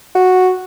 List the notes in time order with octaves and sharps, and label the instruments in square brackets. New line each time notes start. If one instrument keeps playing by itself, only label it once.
[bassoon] F#4